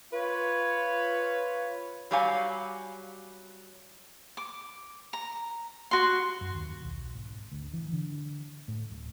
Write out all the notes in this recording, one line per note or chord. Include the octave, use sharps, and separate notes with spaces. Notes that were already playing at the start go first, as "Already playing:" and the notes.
F4 B4 C#5
F#3 G3 G4 C#5 F5 G#5
D6
A#5
F#4 C6
F#2
D#2
B1
G#1
D2
E3
D3
A2
D1